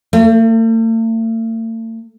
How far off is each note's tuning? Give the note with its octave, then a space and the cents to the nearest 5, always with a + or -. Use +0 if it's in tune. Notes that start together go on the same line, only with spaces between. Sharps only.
A3 +45